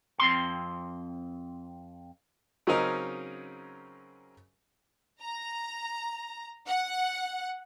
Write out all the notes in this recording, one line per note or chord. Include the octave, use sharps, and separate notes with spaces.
F2 C4 C6
C#3 F#3 C4 C#4 D#4 A#4
A#5
F#5